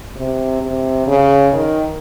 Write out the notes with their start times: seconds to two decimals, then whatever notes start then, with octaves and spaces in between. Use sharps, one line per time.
0.16 C3
0.62 C3
1.07 C#3
1.53 D#3